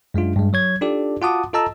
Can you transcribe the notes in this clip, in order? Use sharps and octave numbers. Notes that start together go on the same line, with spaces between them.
F#2 G#3 D4 F4
G2 G#3
F#3 C#5 G#6
D4 D#4 F4 G4 A4 D5
F4 F#4 F#5 A5 D6 D#6
F4 A4 D#5 A5 A#5 E6